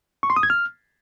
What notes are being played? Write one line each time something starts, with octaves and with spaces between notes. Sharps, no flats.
C#6
C6
D#6
G#6
F6